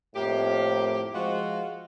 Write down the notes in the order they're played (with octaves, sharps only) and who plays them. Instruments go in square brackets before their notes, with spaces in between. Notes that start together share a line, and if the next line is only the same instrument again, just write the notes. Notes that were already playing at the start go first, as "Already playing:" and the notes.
[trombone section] F2 A2 [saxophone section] A#3 G4
[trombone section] F3 G#3 [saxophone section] F4 F#4